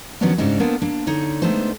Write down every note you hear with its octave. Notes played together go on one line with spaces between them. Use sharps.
D#3 F3 F#3 B3 C#4 D4
G#2 C#3 G3 C4 D4 D#4
A#3 B3 D4 A4 A#4 C5
A#3 D4
D3 D#4 C#5
G#3 A3 B3 D4 D#4 C5